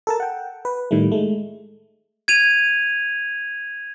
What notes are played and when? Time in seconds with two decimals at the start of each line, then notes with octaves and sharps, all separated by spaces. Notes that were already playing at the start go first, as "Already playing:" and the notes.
0.07 A4 A#4 A5
0.20 F#5 G5
0.65 B4
0.91 A2 D#3 G3 A3
1.12 G#3 A3
2.28 G#6 D#7 F7